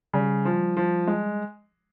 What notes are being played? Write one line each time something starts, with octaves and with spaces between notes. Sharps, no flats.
C#3 G3
F3
F3
G#3